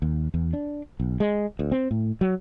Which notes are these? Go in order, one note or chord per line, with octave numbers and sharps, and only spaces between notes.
D#2
E2
D4
B1
G#3
D2
C4
A2
F#3